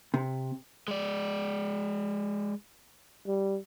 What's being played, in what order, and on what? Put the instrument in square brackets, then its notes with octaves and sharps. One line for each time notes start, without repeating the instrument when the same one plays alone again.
[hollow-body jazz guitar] C3
[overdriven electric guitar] G#3 D5
[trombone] G3